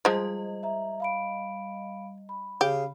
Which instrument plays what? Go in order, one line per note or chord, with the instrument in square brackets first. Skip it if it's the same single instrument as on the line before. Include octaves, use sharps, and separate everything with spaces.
[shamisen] F3 G#3 [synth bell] G3 D#5
[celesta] E5 A#5
F5 B5 D7
B5
[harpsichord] C#3 [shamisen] G4